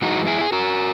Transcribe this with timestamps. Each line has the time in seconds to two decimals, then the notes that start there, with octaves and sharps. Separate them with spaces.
0.02 F#2 E3 G#3 D#4 F#4
0.27 E4 G#4
0.41 G#4
0.52 F#4 A#4